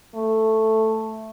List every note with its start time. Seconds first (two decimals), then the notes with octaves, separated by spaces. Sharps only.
0.14 A3